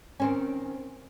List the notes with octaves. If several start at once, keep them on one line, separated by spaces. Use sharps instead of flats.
D#3 C4 C#4